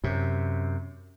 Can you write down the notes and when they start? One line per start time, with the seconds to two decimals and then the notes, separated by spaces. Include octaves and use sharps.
0.04 F#2 C3